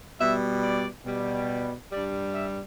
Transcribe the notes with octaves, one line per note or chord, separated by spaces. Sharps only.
B2 G3 E5
D5
B2 G3
G2 G3 D5
E5